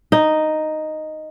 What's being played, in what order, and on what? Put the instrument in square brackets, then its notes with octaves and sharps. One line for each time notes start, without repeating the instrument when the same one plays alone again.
[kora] D#4